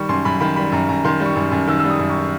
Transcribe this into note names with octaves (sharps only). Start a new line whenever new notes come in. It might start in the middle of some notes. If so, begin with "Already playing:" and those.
Already playing: D#3 G3 C#6
F#2 C6
F#2 B5
D#3 B5
G3 B5
F#2 A#5
F#2 A#5
D#3 C6
G3
C#6
F#2
F#2
D#3 E6
E6
G3
D#6
F#2
C#6